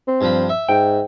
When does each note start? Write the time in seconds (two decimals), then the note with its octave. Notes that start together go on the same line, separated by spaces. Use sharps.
0.08 C4
0.21 G2 F3 B5
0.49 E5
0.69 G#2 G5